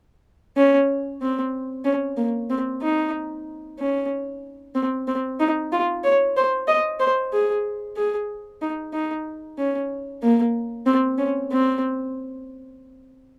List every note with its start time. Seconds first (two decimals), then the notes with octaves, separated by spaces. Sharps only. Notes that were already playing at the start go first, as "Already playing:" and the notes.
0.57 C#4
1.21 C4
1.85 C#4
2.17 A#3
2.50 C4
2.82 D#4
3.79 C#4
4.75 C4
5.07 C4
5.40 D#4
5.72 F4
6.04 C#5
6.37 C5
6.68 D#5
7.00 C5
7.33 G#4
7.96 G#4
8.62 D#4
8.93 D#4
9.58 C#4
10.22 A#3
10.86 C4
11.18 C#4
11.51 C4